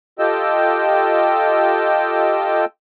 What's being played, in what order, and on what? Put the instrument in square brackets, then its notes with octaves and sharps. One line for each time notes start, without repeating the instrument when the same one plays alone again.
[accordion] F4 G4 A4 D#5 G5 E6